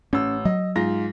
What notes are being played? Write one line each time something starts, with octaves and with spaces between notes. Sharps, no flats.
A1 C#4 E6
F#3 D#5
G#2 F4 A#6